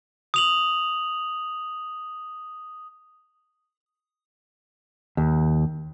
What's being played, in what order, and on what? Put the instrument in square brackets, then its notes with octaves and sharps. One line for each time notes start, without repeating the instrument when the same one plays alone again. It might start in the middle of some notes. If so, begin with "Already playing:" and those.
[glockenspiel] D#6 F7 F#7
[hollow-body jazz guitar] D#2